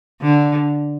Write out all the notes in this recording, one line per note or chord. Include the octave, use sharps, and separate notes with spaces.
D3